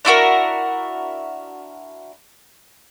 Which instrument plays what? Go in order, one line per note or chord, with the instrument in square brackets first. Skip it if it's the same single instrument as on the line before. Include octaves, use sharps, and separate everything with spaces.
[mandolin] D4 E4 F#4 A#4